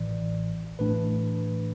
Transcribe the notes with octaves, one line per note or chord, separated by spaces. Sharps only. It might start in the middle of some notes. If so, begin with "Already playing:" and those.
Already playing: A1 A2 E3 D5
A2 E3 A3 D4 B4